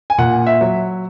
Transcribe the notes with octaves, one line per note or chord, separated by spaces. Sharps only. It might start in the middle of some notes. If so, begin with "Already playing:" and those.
G#5
A#2 F#5
E5
F#3